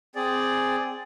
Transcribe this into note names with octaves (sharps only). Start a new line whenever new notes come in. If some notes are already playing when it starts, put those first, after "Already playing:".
C4 G#4 D5